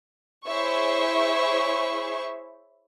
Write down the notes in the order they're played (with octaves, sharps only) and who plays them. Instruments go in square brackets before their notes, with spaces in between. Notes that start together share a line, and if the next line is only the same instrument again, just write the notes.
[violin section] E4 G#4 C5 C#5 E5 C#6